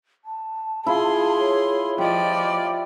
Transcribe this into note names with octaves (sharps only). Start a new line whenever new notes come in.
A5
E4 F4 G#4 C6
C#5
F3 G4 D5 D#5